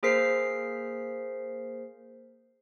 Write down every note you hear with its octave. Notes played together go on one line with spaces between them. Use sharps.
A#3 G#4 A#4 C5 B6 C7